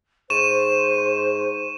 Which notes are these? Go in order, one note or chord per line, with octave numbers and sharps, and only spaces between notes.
G#2 C5 C#6 D#7 E7